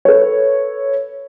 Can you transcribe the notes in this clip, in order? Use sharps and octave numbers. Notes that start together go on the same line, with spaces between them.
A4 B4 C#5